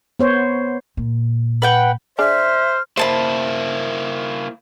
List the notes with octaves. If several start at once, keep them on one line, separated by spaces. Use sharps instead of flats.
B3 C5 C#5
A#2
B4 F#5 G5
D4 G#4 C5 D5 E5 F6
A#3 E4 C5 A5 B5